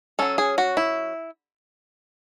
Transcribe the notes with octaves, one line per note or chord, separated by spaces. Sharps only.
F#3 C#4 A4
G#4
F#4
E4